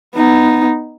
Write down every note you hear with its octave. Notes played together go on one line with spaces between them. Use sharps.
B3 D#4